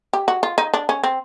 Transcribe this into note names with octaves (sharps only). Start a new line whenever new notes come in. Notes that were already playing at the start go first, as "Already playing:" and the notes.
G4
F#4
F4
D#4
D4
C#4
C4